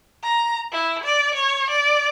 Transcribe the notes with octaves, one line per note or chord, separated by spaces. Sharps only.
A#5
E4
D5
C#5
D5